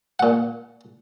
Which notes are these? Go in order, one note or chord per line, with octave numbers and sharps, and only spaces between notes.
A#2 F#5